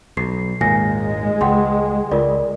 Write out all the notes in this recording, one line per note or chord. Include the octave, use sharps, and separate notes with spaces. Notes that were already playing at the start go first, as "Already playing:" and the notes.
B1 C7
G#1 D#2 A#2 G#3 G#5 A#6
C#2 F#5 G5 C6
C#2 F4 A#4 D5